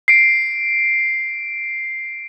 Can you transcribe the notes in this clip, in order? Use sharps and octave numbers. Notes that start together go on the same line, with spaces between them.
C7 D7